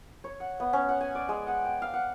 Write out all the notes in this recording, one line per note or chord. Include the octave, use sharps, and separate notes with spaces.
C#5
F#5
B3
C#4
F#5
G#5
D5
G#3
F#5
G5
F5
F#5